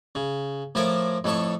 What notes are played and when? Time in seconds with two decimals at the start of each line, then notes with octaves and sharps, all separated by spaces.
0.15 C#3
0.75 A2 F3 A4 A#4 C#5 D6
1.24 F2 A2 A4 C#5 C#6